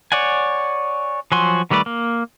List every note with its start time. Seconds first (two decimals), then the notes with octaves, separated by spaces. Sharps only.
0.12 C#5 D5 F#5 G#5
1.32 F3 F#3 F#4 G#5 C6
1.71 D#3 G3 A3 B4 D5
1.86 A#3